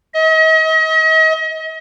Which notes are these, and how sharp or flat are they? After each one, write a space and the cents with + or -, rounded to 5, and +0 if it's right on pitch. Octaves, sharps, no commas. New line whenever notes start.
D#5 +40